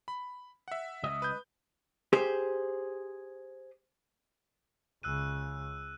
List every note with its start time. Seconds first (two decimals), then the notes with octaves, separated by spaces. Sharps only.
0.08 B5
0.68 E5 F#5
1.03 C#2 D#5
1.22 B4 G6
2.13 G4 G#4 C5
5.03 C#2 C#3 E6 F#6 D#7